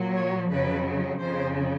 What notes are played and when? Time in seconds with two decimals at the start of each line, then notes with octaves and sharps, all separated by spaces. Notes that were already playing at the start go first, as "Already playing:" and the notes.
Already playing: A#2 F#3
0.15 C#5
0.50 F2 C#3 F#3 B4
1.20 F2 C#3 F3 C5